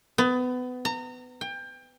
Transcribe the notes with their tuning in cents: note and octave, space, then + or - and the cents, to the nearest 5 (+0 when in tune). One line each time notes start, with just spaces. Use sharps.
B3 +25
A#5 -30
G5 +25